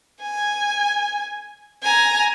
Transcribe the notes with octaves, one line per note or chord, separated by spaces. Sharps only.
G#5
G#5 A#5